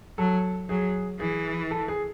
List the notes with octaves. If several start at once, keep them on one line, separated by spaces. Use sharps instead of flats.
F#3 A4
F#3 G#4
E3 G#4
A4
G#4